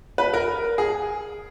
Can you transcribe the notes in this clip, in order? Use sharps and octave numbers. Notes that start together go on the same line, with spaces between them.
B4
A#4
G#4